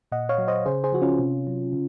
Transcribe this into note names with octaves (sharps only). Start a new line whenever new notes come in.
A#2 D#5 F#5
C#5 F5
F#3
C5 D#5
C#3 G#4 C5
G#4 C5
F3 F#4
C#4 F4
C3
F#3
C#3